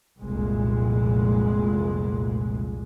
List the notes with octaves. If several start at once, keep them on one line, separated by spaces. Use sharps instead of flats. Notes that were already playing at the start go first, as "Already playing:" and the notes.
F1 C2 A#2 G#3